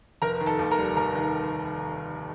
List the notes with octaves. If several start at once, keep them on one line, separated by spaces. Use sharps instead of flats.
F1 A#4 A#5
D#3
A4 A5
D#2
A#4 A#5
G3
F1 A#4 A#5
D#3